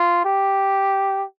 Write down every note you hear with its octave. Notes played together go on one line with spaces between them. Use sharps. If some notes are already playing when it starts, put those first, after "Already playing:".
Already playing: F4
G4